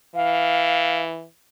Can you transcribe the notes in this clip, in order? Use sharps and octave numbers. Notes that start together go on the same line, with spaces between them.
E3 F5